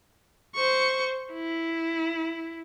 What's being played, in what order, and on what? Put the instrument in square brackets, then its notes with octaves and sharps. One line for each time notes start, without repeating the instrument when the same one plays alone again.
[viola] C5 C#6
E4